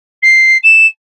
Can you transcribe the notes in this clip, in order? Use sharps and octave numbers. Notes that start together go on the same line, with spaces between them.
C7
E7